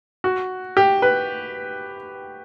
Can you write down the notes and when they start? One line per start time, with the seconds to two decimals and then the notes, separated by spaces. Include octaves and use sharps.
0.24 F#4
0.77 G4
1.02 B4